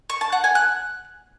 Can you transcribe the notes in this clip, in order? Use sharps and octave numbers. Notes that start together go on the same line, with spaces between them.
C#6
A5
F#5
G#5
F#6